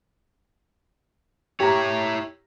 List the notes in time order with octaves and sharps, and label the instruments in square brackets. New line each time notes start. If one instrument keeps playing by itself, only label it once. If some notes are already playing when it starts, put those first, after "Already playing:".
[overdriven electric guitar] E4 C#5 [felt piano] G4 A#5